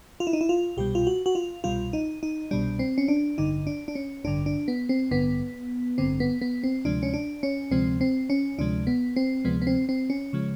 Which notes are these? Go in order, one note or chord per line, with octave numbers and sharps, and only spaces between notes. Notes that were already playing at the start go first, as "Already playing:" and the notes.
F4
E4
D#4
E4
F4
C2 B2 G3 G4
F4
F#4
F#4
F4
C2 B2 G3 F4
D#4
D#4
C2 B2 G3 D4
C4
C#4
D4
A1 G2 D3 D#4
D4
D4
C#4
A1 G2 D3 D4
D4
B3
C4
A1 G2 D3 B3
A1 G2 D3 C4
B3
B3
C4
D2 C3 F3 G#3 D4
C#4
D4
C#4
D2 C3 F3 G#3 C4
C4
C#4
D2 C3 F3 G#3 D4
B3
C4
D2 C3 F3 G#3 B3
B3
C4
C4
C#4
C#3 F3 G#3